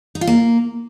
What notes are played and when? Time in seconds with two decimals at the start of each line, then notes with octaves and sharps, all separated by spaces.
0.15 D#4
0.21 F4
0.27 A#3